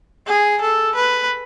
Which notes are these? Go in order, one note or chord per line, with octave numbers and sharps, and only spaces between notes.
G#4
A4
B4